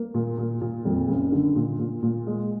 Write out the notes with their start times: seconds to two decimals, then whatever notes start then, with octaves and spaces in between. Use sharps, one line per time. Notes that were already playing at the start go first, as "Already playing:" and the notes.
Already playing: A#3
0.14 A#2
0.38 A#2
0.61 A#2
0.85 F2
1.08 F#1
1.32 D3
1.56 A#2
1.79 A#2
2.03 A#2
2.27 G#3